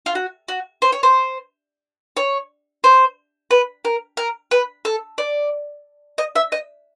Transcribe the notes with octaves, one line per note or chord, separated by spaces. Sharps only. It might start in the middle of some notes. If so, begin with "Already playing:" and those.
F4
F#4
F#4
C5
C#5
C5
C#5
C5
B4
A#4
A#4
B4
A4
D5
D#5
E5
D#5